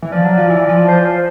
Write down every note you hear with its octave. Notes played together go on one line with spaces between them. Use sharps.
E3
F3 D5
F#3
F3
E3
F3
C5
C5
C5